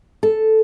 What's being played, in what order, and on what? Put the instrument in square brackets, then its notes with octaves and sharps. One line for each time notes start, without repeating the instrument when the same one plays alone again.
[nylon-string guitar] A4